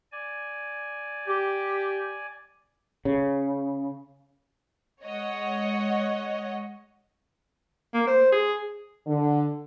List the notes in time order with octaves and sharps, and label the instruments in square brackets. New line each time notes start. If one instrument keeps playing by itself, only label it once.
[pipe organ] D5 G#5
[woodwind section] G4
[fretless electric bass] C#3
[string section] G#3 C#5 D#5 F#5
[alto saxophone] A#3
C5
G#4
[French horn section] D3